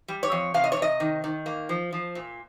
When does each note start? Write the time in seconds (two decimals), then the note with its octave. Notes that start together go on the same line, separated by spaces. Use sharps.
0.08 G3
0.23 C#5
0.32 F2
0.54 C3 F5
0.64 D#5
0.72 C#5
0.77 C3
0.82 D#5
1.00 D#3
1.24 D#3
1.46 A#3
1.69 F3
1.93 F3
2.15 A#2